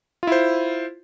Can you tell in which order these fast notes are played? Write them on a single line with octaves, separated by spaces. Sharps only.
F4 E4 C5